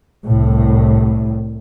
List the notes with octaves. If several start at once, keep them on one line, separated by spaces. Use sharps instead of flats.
C2 A2